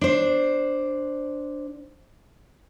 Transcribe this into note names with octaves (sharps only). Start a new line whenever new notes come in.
D4 C5